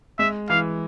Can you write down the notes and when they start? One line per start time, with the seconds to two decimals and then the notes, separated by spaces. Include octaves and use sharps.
0.19 G#3 E5
0.50 E3 F5